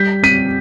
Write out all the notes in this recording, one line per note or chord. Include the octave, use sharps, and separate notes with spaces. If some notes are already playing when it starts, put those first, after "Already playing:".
Already playing: G3 G6 B6
C4 B6 D#7